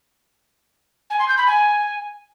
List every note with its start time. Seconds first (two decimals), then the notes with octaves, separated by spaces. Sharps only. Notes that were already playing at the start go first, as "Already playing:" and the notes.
1.10 G#5
1.19 C6
1.28 G6
1.38 B5
1.47 G#5